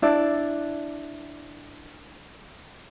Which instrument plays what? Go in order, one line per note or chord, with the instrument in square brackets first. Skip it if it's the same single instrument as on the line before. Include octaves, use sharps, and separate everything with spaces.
[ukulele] D4 E4 D5